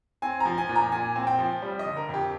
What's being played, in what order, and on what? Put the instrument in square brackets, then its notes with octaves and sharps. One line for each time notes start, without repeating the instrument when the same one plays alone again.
[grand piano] C4 G#5
F3 A#5
G#5
A#2
A#5
A#2 G#5
C4
G5
F3
G3
D#5
D3
A#4
F2
G4